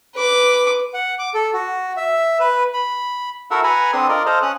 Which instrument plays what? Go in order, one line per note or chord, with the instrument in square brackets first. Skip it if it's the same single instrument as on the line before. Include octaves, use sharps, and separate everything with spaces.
[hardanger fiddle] B4 D6
[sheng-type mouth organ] F#5
D6
A4
F#4
E5
B4
B5
[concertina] E4 F#4 A4 A#4 E5 F#5
B4 F#5 G#5 A#5 B5
C4 D4 A4 C6 D#6
F4 A#4 D5 D#5
A4 C5 D#5 F5
C#4 D#6 F#6